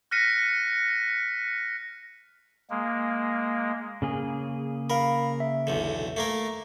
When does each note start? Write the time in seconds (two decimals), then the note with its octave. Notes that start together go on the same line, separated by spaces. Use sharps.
0.11 F6 F#6 A#6 B6 C#7 D#7
2.70 G#3 A#3
4.02 C#3 A#3 G#4
4.90 A#4 F5 B5
5.40 E5
5.67 B1 E2 D3
6.17 A3 A#3 A#4